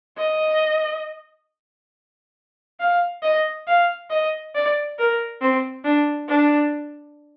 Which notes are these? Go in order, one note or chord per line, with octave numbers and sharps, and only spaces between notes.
D#5
F5
D#5
F5
D#5
D5
A#4
C4
D4
D4